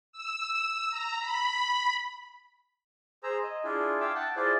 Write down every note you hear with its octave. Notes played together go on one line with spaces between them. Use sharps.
E6
A#5
B5
G#4 C5 A#5 E6
D#5
D4 E4 F4 G#4
E5 F5 G5 D6 E6
F#5 G5 A5
E4 F4 G#4 C5 D5